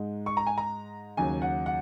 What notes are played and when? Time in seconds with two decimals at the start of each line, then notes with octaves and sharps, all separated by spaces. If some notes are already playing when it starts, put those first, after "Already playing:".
Already playing: G#2 G#3
0.26 C#6
0.37 A#5
0.47 G#5
0.58 A#5
1.17 D#2 C#3 F#3 G#5
1.42 F#5
1.66 F#5